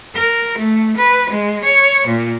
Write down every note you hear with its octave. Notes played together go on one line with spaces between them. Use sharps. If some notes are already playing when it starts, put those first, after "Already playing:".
A#4
A3
B4
G#3
C#5
A#2